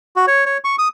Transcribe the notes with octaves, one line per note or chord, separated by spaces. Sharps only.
F#4
C#5
C#5
C#6
D#6